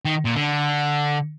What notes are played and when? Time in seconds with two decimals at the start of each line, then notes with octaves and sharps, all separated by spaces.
0.05 D#3
0.25 A#2
0.35 D3